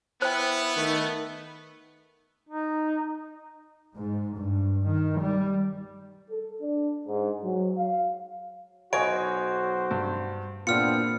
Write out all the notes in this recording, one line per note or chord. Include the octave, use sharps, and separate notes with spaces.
B3 E4 C5 G5
D#3 A3
D#4
G#2
G2
D#3
G3
A4
D4
G#2
F#3
F5
B1 F#4 C5 C#5 D#5 G#5 D7
G2
E2 A#2 B3 C4 D4 F4 F6 C#7